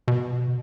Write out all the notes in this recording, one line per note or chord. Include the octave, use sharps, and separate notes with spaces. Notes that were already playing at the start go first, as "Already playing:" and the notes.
B2